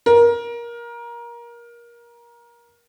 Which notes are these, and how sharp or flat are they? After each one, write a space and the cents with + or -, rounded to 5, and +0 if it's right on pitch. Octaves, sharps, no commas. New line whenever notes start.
A#4 +20